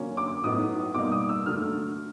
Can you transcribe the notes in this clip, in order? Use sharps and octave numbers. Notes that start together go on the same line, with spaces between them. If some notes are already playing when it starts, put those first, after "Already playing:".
Already playing: D3 F#3 A#3 C#4
D6
A2 F#3 B3 D#4 D#6
B2 G3 A#3 D#4 D6
D#6
E6
D3 F#3 A3 F6